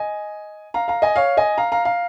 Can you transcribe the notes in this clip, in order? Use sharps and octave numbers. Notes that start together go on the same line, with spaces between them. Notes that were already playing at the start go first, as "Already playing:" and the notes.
Already playing: D#5 G#5
F5 A#5
F5 A#5
D#5 G#5
C#5 F5
D#5 G#5
F5 A#5
F5 A#5
F5 A#5